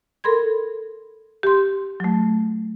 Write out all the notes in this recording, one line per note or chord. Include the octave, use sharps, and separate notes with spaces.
A4 A#4 B5 C6 G#6
G4 C6
F#3 A3